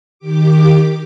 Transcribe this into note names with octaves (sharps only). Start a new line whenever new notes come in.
D#3 G4 D6